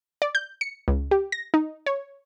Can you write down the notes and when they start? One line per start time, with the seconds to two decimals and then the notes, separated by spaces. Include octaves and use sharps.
0.22 D5
0.35 G6
0.61 C#7
0.88 C#2
1.11 G4
1.32 A#6
1.54 D#4
1.86 C#5